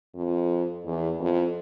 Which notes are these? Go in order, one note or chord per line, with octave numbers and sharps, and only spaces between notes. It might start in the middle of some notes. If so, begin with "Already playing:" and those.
F2
E2
F2